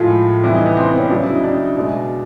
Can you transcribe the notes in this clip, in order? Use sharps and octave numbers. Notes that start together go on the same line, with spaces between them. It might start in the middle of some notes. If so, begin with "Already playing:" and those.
Already playing: A2 F3 G#3 F4
C3 E3 G3 E4
D#4
B3
C4
C4
C#4
C#3 F#3 D4
E4
D#4
D4
B2 G#3